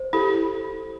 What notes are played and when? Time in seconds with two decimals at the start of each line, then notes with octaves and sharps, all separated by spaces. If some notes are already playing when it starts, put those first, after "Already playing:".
Already playing: C5
0.13 E4 G4 A4